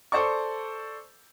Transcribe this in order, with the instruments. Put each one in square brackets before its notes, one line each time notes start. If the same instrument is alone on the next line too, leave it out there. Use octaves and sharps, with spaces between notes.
[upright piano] A4 C5 D5 C#6